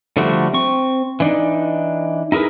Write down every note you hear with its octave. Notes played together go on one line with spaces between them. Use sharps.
D3 F3 G3 A3 F#4
C4 C#6
E3 D4 D#4
D#4 E4 G#4 A#4 B4